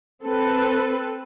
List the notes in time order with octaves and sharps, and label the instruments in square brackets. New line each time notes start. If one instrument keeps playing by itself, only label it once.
[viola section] C4 A4 B4